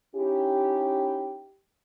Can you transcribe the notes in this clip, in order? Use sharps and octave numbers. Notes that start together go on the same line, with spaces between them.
C#4 D#4 E4 G4